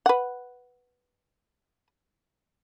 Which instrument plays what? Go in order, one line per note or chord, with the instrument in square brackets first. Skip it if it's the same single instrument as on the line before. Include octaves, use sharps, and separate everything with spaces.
[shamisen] B4 F#5